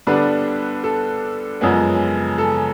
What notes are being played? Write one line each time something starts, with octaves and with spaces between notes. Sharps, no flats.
D3 G3 B3 D4 B4
A4
F#2 C#3 F3 G#3 B3
A4